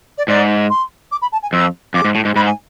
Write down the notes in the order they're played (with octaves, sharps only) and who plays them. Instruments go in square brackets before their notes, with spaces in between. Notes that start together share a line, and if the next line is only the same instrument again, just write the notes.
[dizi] D5
[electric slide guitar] G#2 [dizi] D5
[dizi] C6
D6
B5
A5
G#5
[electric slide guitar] F2 [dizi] E6
[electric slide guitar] F2 [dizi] D6
[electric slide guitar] G#2
A2
G#2
[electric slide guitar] G#2 [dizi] B5
[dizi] G#5